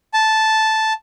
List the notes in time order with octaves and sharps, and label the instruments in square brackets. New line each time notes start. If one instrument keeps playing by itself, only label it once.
[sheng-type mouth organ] A5